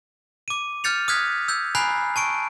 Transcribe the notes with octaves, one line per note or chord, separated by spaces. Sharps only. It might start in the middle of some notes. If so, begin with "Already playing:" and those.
D6 D#7
F6 G6 A6 C#7 F7
D#6 F6 F#6 G#6 B6
E6 G6 G#6
G#5 A#5 B5 F#6 G6 C7
A5 C#6 D7